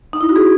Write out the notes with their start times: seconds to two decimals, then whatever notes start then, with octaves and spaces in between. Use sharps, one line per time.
0.13 D#4
0.21 E4
0.29 F#4
0.36 G#4